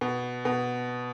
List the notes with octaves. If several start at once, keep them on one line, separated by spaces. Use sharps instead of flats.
B2
B2